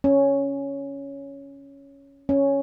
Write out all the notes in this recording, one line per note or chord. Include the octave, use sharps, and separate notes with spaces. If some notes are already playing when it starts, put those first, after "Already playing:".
C#4
C#4